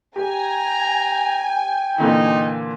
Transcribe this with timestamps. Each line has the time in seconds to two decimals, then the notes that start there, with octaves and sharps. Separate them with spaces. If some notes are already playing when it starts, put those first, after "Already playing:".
0.16 G4 G5 G#5 A#5
1.98 A#2 D3 E3 D#4